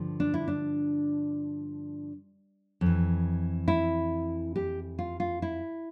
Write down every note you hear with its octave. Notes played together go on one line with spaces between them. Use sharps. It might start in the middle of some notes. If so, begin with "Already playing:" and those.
Already playing: G2 D3 F3
D4
E4
D4
F2 E3
E4
G4
F4
F4
E4